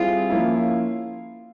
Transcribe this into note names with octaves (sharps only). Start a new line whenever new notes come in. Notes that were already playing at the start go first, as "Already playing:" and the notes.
Already playing: G3 C4 E4 F4 G#4
F3 A#3 C#4 E4